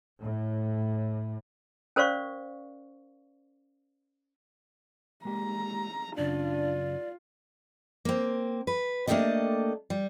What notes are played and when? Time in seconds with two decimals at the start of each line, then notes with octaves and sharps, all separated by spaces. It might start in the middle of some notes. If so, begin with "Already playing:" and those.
0.20 A2
1.96 C#4 A#4 C5 D5 F5 C#6
5.25 G#3 A#3 G4 A#5
6.18 F#2 C#3 D4 F4 D5
8.05 A#3 C4
8.67 B4
9.07 A3 A#3 D4 G4 A4 D#5
9.90 G3